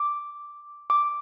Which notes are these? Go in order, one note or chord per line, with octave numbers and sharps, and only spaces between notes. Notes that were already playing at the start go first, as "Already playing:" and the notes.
Already playing: D6
D6